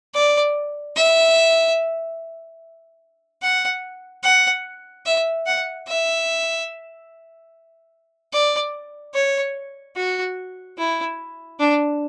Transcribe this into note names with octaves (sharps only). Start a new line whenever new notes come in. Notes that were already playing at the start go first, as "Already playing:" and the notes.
D5
E5
F#5
F#5
E5
F#5
E5
D5
C#5
F#4
E4
D4